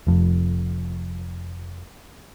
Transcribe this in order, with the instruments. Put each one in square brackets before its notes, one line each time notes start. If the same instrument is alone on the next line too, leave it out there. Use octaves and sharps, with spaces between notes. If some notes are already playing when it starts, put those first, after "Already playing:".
[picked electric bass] F1 F2